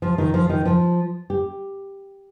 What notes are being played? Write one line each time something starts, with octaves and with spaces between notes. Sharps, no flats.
F3
D#3
F3
D#3
F3
G4